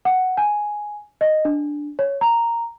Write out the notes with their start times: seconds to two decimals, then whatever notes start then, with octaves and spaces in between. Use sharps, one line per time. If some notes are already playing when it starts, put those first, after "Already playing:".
0.05 F#5
0.37 G#5
1.21 D#5
1.45 D4
1.99 C#5
2.21 A#5